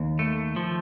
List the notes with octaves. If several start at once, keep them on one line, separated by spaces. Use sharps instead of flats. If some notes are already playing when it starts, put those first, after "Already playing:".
Already playing: D#2
A3
F3